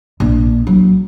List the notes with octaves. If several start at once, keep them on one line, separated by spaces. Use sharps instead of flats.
A#1
F#3